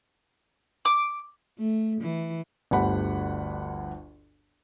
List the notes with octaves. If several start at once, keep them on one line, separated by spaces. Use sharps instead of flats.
D6
A3
E3
G1 D2 G4 F#5 B5